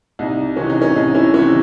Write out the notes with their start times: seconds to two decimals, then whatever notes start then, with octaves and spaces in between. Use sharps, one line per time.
0.19 C2 D#4
0.56 C3 E3 C#4
0.70 D#4
0.82 C#4
0.96 C2 D#4
1.14 C#4 E4
1.34 C3 E3 C#4 E4